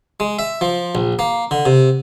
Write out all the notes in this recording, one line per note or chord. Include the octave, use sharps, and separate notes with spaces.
G#3
E5
F3
A#1
A#3
D3
C3